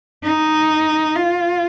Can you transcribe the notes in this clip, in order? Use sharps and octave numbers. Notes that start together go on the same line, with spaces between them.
D#4
F4